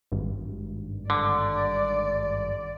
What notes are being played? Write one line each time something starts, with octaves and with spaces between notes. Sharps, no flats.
G#1 G2
D3 D5